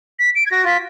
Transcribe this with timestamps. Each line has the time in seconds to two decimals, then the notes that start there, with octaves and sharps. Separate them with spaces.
0.19 B6
0.35 D7
0.46 G#6
0.51 F#4 A#6
0.64 F4 B6